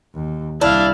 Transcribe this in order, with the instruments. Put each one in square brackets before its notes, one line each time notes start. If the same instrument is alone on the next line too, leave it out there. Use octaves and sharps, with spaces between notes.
[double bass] D#2
[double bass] C2 [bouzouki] D4 [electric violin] E4 F5